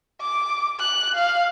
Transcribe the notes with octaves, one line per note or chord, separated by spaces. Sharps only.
D6
F#6
F5